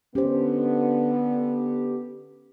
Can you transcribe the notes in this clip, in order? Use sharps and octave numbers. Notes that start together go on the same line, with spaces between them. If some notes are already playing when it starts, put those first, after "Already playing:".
D3 B3 C#4 G4 C5